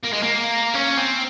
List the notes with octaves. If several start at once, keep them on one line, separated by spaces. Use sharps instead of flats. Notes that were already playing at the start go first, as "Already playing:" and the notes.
A#3
G#3
A#3
C#4
C4